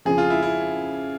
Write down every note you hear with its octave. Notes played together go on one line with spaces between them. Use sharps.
F2 C#3 F3 G#4
F4
E4
E4